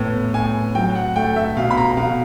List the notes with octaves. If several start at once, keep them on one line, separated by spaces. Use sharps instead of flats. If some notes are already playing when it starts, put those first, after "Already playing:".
Already playing: A2 B3
A2 G#5
F#3 G5
F#5
A3 G5
E5
B2 F5
B5
A#5
B2 F5